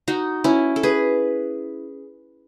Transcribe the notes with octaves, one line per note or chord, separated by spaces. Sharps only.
D#4 F#4
C#4 E4
A4
G#4 B4